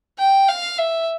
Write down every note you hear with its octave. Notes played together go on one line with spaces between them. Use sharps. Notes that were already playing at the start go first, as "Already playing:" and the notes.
G5
F5
E5